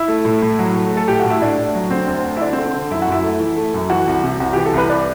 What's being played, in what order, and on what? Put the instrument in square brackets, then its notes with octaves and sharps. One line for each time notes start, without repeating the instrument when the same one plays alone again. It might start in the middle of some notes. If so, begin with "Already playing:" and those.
Already playing: [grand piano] E4
A3
A2
A2
F#3
A3
A3
A4
A2 G4
A2 F#4
E4
A2 D4
A2
F#3
D3 C4
D2
D2
E4
D3 D4
C4
D3
C4
D3
F#2 E4
F#4
F#2 E4
A3
E3
A3
F#2
E3 F#4
C2
C3
C2 F#4
E3 G4
A4
C2 B4
D5